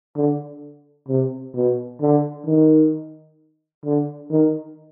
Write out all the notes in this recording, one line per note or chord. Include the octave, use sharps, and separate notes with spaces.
D3
C3
B2
D3
D#3
D3
D#3